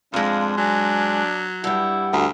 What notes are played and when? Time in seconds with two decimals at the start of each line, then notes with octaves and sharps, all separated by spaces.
0.13 F2 G#2 G#3 D4 F5
0.57 F#3 D4 G#5
1.64 G2 G3 E4 F#5
2.13 D2